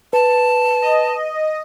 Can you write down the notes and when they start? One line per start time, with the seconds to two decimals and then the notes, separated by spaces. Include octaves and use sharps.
0.13 B4 A5
0.82 D#5